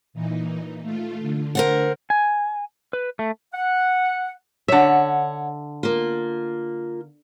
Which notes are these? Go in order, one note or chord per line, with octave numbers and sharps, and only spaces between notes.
A#2 E3 D#4
A3 F4
D3
A#4 C5 F#5
G#5
B4
A3
F#5
D3 C#5 E5 F#5
A#3 F4